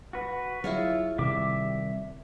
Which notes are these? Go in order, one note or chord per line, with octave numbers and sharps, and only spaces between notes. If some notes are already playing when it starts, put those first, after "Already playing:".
F#4 B4
F#3 E4 F4 G#4 C#5
C3 D#3 G3 E5 D6